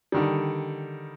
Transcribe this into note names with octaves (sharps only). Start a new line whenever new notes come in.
D3 D#3 G3